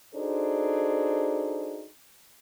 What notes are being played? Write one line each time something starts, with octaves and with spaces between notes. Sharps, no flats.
D4 D#4 F#4 G#4 A4 C5